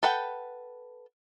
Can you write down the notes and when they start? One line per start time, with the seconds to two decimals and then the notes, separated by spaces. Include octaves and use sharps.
0.03 A4 B4 F#5 G5